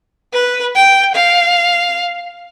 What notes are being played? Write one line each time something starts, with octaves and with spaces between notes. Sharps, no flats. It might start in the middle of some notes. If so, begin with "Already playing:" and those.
B4
G5
F5